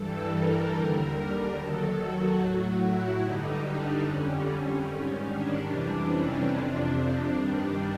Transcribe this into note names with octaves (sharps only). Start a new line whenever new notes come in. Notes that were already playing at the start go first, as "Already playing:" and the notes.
Already playing: G2 E3 G3 A4
A#4
D#2 D3 G3
D#2 D#3 F#3 A4
F#4
A2 F#3
E4
G2 D3 G3 D#4
D4
F2 D3 G3 C#4
C#4
G#2 D#3 G3
D4
F2 C3 E3 G3
C#4
F2 C3 F3 D4
G2 D#3 G3 D4